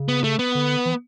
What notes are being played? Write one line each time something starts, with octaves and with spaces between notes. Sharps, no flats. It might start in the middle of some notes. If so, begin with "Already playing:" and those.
Already playing: C#3
B3
A3
B3
D3
E3